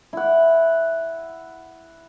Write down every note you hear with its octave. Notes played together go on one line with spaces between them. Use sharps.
E4 F#5